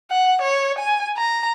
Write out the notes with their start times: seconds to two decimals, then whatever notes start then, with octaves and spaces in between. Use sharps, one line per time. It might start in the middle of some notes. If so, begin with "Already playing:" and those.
0.11 F#5
0.41 C#5
0.78 G#5
1.18 A#5